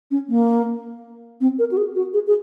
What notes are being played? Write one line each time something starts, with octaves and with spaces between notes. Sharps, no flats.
C#4
A#3
C4
A#4
F#4
G#4
F#4
G#4
G#4